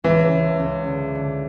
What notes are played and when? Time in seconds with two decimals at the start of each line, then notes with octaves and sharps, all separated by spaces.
0.04 C#2 E3
0.31 C#2
0.60 C#2
0.87 D3
1.15 D3